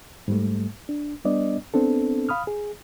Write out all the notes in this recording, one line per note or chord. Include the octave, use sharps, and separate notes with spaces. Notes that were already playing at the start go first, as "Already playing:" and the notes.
G#2 G3 A3
D4
G3 B3 D4 D5 D#5
B3 C4 D4 A4
F5 B5 D#6 F6
G#4